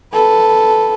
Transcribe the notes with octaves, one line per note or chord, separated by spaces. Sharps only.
A4 B4